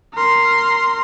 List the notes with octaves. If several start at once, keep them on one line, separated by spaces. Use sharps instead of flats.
A#4 C6